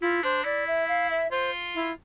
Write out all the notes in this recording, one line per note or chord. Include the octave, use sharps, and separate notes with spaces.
E4 F4
D4 C5
E4 D5
E5
F5
E5
F4 C5
E4